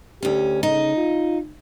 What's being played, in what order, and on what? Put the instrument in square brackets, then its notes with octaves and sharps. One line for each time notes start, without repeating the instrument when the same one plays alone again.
[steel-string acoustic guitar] D2 C#4 [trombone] G4
[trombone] C#3 [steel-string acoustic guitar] D#4
[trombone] F4